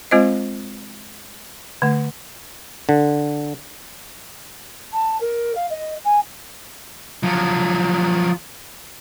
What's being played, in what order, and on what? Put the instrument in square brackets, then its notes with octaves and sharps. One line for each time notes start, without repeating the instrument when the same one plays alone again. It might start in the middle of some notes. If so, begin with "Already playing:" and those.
[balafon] G#3 C4 F4 C5 D#5
D3 A3
[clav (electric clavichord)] D3
[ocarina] A5
A#4
F5
D#5
G#5
[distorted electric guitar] F3 F#3